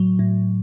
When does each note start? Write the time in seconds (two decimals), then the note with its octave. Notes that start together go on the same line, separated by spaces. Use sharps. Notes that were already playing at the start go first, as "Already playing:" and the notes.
Already playing: A2 F#3
0.19 A2